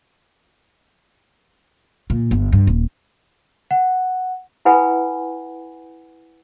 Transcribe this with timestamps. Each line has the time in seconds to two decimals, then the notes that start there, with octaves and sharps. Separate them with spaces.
2.10 A#2
2.31 G1
2.52 G2
2.67 D#1
3.71 F#5
4.65 E4 A4 B4 F#5 G#5 B5